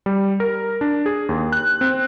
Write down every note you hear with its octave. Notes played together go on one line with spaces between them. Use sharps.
G3
A#4
D4
G#4
D#2
F#6
C4